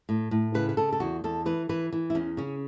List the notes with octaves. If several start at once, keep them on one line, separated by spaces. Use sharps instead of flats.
A2
A2
C#3 B4
B4
C#3 A4
A4
E2 F#4
E2 A4
E3 B4
E3 B4
E3
E4
E2 C#4
C#3 C#4